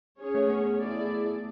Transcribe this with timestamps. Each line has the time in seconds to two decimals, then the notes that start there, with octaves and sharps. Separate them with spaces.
0.19 C#4 G#4 C#5
0.35 A3
0.50 B3
0.80 A3 E4 G#4 D5